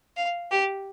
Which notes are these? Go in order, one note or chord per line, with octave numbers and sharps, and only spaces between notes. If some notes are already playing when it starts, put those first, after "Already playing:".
F5
G4